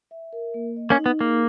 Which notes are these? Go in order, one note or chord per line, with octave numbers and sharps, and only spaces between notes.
E5
A#4
A#3
D#5
A#3 C#4
D#4
B3
A#3 G#4